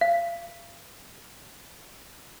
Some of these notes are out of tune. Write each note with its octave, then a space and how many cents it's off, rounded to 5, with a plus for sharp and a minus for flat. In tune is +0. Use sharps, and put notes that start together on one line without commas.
F5 -30